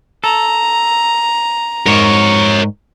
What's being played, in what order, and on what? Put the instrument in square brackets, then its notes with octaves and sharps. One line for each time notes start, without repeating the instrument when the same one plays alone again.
[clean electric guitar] A4 [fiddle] A#5
[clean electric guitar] G#2 [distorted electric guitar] A#4 C#5